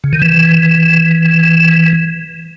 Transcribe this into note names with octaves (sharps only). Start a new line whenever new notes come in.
C#3
D#3
E3